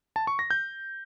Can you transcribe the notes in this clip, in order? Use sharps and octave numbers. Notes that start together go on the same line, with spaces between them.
A5
C#6
A#6
G6